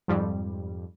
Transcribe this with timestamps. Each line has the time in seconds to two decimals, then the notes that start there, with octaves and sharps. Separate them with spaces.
0.08 F2 G#2 G3